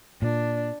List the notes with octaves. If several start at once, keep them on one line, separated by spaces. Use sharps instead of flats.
A#2 D4